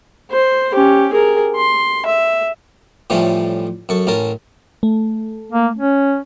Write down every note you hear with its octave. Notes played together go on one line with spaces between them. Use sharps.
C5
C#4 G4
G#4 A#4
C6
E5
A2 E3 F3 G3 C#4 A4
F#2 A4 C#6
A1 C#4 A#4 A5
A3
A#3
C#4